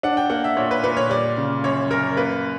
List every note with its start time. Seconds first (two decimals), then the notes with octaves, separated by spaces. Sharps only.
0.03 D4 F#5
0.17 G5
0.30 A#3 F#5
0.44 E5
0.57 A#2 C#5
0.71 B4
0.84 A#2 B4
0.97 C#5
1.10 G3 D5
1.37 C#3
1.64 F#2 C#5
1.90 F#2 A#4
2.17 A#3 B4